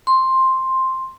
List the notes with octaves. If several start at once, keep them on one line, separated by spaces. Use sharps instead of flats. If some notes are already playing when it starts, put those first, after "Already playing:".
C6